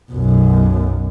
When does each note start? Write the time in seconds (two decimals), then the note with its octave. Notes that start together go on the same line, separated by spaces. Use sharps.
0.11 B1 F#2